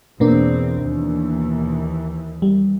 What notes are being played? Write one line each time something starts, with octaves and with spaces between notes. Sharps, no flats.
E2 B2 A#3 C4 D4
D#2 E3
G3